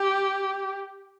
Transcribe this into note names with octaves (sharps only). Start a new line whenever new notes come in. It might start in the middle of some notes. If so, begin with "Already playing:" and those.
Already playing: G4